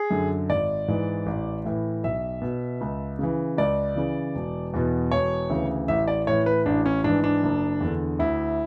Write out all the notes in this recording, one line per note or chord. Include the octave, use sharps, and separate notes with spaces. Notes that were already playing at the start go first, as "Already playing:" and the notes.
Already playing: G#4
F#2 D3
G#1 D5
G#2 E3
A1
A2 E3
B1 E5
B2
C#2
C#3 E3
C#2 D5
C#3 E3
E1
E2 B2
E1 C#5
D2 C#3 E3
A1 E5
D5
A2 E3 C#5
B4
A1 D4
C#4
G#2 E3 D4
D4
F#1
E2
D3
D2 E4